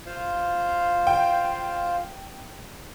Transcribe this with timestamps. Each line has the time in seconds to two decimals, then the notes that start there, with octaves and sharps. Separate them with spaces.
0.06 F4 C5 F5
1.07 G5